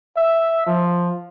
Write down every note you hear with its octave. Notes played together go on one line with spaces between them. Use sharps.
E5
F3